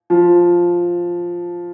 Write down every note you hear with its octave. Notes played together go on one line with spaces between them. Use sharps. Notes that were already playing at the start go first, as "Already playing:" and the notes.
F3